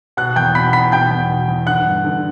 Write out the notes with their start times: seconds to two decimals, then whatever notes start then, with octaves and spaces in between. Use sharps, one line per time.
0.17 B2 F#5 F#6
0.36 E2 G5 G6
0.55 B2 B5 B6
0.73 E2 B5 B6
0.92 B2 G5 G6
1.11 E2
1.29 B2
1.48 E2
1.67 D3 F#5 F#6
1.85 G2
2.05 D3